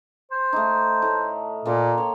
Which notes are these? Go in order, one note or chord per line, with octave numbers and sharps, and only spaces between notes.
C5
A3 D#4
A2
A#2 A#3 A4 C5
C#5 G5